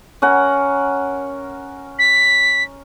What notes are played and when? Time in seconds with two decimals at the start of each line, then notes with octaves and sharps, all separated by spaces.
0.22 C#4 A#4 F#5
1.99 B6